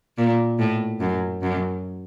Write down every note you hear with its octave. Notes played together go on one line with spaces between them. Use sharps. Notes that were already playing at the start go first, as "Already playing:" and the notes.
A#2
A2
F#2
F#2